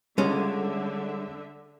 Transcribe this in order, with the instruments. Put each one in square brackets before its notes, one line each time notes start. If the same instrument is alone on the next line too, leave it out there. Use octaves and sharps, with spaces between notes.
[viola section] D3 E5 [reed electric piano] G3 [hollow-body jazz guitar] G#3 C#4